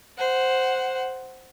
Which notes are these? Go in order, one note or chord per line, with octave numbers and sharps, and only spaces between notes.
C5 F#5